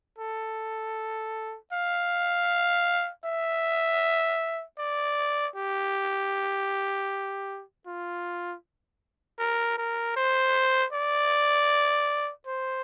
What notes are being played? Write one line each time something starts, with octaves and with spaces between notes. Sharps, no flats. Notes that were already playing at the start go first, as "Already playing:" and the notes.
A4
F5
E5
D5
G4
F4
A#4
A#4
C5
D5
C5